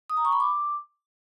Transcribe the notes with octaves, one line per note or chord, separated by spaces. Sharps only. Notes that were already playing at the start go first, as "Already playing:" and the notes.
D#6
A#5
C#6
B5
D6